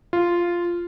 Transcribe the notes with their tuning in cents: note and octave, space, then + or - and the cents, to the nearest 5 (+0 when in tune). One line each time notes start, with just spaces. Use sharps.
F4 -5